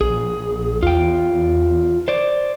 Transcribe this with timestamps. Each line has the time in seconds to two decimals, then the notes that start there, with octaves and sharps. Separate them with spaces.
0.01 A#1 G#4
0.83 E2 F4 G5
2.08 C5 D5